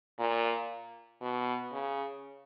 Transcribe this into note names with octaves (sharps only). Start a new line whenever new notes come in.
A#2
B2
C#3